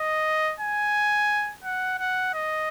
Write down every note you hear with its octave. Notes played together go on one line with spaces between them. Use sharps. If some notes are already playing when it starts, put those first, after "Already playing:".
Already playing: D#5
G#5
F#5
F#5
D#5